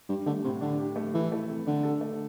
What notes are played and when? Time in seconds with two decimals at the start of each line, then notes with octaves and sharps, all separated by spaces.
0.09 G2 G4
0.26 D3 A3
0.44 A2 C3
0.61 D3 D4
0.79 G4
0.96 A3
1.13 E3 A4
1.32 A3
1.48 C3
1.66 D3 D4
1.83 A4
2.01 A3